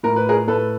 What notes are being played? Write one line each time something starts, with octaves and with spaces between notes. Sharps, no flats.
A2 A#4
B4
G#4 A#4
A2 A4 B4